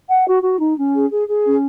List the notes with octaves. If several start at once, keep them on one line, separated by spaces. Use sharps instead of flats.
F#5
F#4
F#4
D#4
C#4
G#4
G#4
G#4
C#4